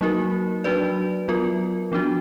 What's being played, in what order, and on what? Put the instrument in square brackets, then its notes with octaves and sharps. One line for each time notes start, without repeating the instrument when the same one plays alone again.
[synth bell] F#3 A#3 D#4 F#4 A#4
F#3 D4 F#4 B4 D5
F#3 B3 F4 A#4
F3 B3 D4 F#4